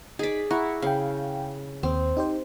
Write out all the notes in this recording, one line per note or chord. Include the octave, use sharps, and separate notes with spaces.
D#4 G#4 D5 B6
E4 F#5 A#5 C#6
C#3 F5 G5
D#2 C4
D#4 G4 C5